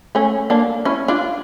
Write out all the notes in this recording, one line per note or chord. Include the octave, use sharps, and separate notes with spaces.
A3 C#4
A#3 D4
C#4 E4
D4 F4